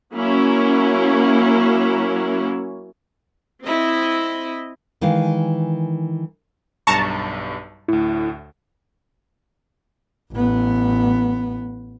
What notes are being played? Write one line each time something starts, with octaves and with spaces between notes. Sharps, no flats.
F#3 A#3 C#4 E4
C4 E4 D#5
D#3 E3 G#3 G#4 F5
B1 G2 A5 A#5 C#6
D2 A2 E4
A1 B3